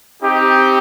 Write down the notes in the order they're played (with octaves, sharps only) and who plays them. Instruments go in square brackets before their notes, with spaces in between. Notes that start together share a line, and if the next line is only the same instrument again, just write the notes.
[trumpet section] C4 D#4 G4